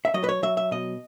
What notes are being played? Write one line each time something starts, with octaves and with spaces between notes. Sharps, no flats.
E5
F#3 D#5
B4
C#5
F#3 E5
E5
B2 D#5